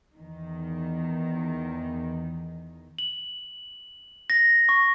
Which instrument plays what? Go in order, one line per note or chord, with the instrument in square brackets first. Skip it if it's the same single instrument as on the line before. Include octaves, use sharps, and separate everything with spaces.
[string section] E2 D#3
[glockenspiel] F#7
A#6
C#6